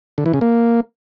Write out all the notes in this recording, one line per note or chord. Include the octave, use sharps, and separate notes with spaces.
D3
E3
C#3
A#3